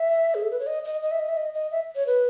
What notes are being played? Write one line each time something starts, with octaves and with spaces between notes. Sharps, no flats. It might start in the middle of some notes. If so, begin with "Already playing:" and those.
Already playing: E5
G#4
A4
B4
C#5
D#5
D#5
D#5
E5
D#5
E5
D#5
D#5
E5
C#5
B4